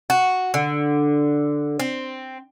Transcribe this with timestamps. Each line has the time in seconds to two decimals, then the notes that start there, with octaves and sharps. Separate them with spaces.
0.10 F#4
0.54 D3
1.80 C4